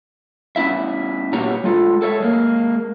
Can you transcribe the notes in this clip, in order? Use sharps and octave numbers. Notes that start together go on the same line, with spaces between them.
B3 C#4 E4 E5
A#2 B3 F#4 G4 C#5 A#5
G#3 F4 A4
A4 C#5 E5
G#3 A#3